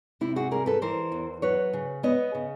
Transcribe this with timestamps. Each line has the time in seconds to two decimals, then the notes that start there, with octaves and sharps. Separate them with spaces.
0.21 C3 E4
0.36 F#4 G#4
0.51 G3 G#4 A#4
0.66 A4 B4
0.82 E3 A#4 C5
1.12 E2
1.42 F#3 B4 C#5
1.73 C#3
2.03 B3 C#5 D#5
2.35 C#3